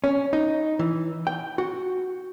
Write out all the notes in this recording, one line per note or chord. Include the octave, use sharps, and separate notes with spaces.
C#4
D#4
E3
G5
F#4